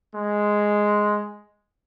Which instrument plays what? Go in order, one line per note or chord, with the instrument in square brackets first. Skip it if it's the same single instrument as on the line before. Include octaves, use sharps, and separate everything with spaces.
[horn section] G#3